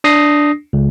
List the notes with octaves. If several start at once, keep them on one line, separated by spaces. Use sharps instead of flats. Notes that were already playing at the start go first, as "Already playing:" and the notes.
D4 D#6 A#6 C7
C#2